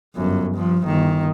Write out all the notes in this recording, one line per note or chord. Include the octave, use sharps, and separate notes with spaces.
G1 F#2
G2 F3
G1 D#3